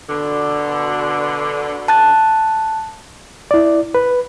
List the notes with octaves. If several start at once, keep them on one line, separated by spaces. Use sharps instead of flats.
B2 D3
A5 F#6 A6
E4 D5
B4